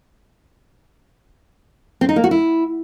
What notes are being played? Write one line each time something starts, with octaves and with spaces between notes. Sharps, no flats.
C4
D#4
A#3
F#4
E4